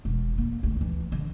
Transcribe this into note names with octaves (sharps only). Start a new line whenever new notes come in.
E1
A#3
D2
E3
D3